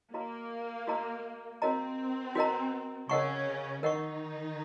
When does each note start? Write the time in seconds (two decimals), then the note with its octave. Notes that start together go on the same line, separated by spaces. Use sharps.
0.14 A#3 F#4 A#4 D#5 A#5
0.87 F#4 A#4 D#5 A#5
1.62 C4 F#4 A#4 D#5 A#5
2.35 F#4 A#4 D#5 A#5
3.09 C#3 C#4 A#4 D#5 F#5 C#6
3.83 D#3 D#4 A#4 D#5 F#5 C#6